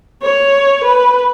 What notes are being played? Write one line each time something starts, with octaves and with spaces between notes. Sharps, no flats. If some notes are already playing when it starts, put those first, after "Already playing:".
C#5
B4